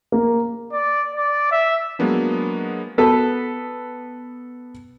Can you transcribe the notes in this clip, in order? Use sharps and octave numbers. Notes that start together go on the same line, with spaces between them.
A#3
D5
D5
E5
F#3 G#3 A#3 B3 D4
B3 A4 B4